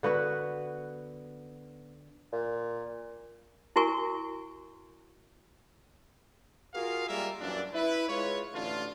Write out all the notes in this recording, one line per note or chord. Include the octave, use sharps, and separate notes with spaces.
D3 B3 F#4 B4
A#2
E4 F#4 A#4 G#5 C#6
F4 F#4 G#4 A#4 F5
G3 G#3 A#3 F4 A#4 E5
F#2 A#2 E3 D4
E4 B4
G#3 F4 B4 C#5
A1 D3 A3 D4 F4